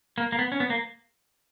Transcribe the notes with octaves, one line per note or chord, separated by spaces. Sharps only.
A#3
A#3
B3
C#4
B3
A#3